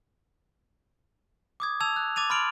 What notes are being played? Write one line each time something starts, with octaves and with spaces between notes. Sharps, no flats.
D6 D#6 G#6
A5 E6 G#6 F7
F#6
D6 A6 D#7 F7
B5 C6 F6 A6 D7 F#7